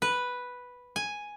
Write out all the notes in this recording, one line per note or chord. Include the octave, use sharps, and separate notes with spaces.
B4
G#5